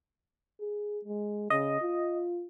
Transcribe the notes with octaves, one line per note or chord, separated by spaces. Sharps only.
G#4
G#3
C#3 D#5
F4